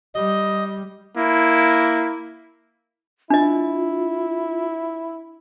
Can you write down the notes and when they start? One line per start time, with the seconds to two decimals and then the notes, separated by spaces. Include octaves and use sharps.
0.15 G3 D#5
1.17 A#3 E4
3.30 D4 E4 F4 D#5